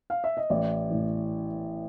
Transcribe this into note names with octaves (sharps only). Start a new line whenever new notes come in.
F5
E5
D#5
A1 D5
A2 E3